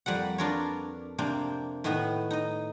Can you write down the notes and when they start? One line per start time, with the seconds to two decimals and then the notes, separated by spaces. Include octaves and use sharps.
0.06 F2 G3 A#3 F#5
0.38 D4 F4 A#4 B4 C#5
1.18 C3 A#3 C4 D4
1.84 A2 D#3 B3 E4 B4 D#5
2.31 D#4 D#5